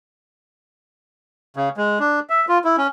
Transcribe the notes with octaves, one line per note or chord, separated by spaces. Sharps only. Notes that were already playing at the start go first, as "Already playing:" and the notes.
C#3
G#3
D4
E5
F4
E4
C#4